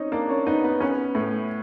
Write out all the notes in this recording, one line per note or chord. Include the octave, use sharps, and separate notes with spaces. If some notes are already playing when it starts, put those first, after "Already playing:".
Already playing: C4 C#4 D#4 C#5 D#5
A#3 D4 D5
C#4 C#5
B3 D#4 B4
B3 B4
B3 C#4 B4
A2